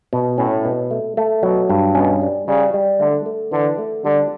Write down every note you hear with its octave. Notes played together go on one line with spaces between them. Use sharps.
B2
A2 C#4
B2
A3
A3
B2 F#3
G2
B2 C#4
G3
C#3 G3
G3
D3 A3
A3
D3 E3
A3
D3 G3